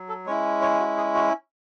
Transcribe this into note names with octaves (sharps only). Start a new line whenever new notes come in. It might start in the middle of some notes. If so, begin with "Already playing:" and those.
Already playing: F#3
A4
G#3 C#4 E4 C#5
C#5
F#4
G#4
F#4